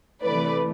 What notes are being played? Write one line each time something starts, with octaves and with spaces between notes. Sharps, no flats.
C3 E3 A3 B4 D5